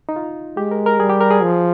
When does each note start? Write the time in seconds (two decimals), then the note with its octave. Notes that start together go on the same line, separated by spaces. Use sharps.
0.09 D#4
0.16 F4
0.57 G#3 G4
0.71 A#4
0.86 A#4
1.00 G3 G#4
1.10 G4
1.21 A#4
1.31 G#4
1.42 F3